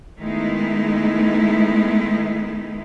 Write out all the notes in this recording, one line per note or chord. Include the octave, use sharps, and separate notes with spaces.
D#3 G#3 A3 B3 D#4 E4